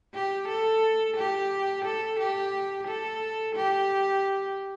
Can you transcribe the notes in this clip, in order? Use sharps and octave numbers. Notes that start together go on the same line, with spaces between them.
G4
A4
G4
A4
G4
A4
G4